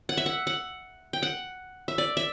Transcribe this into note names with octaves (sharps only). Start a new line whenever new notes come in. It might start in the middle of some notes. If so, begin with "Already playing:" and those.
F#5
E5
F#5
F#5
G5
F#5
E5
D5
E5